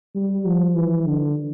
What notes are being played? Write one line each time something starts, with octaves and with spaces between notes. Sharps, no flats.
G3
F3
E3
D3